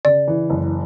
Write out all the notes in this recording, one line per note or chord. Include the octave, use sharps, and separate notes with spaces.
C#3 D5
E3
F#1